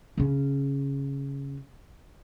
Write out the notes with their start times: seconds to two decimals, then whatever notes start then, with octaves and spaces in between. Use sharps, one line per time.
0.18 C#3 C#4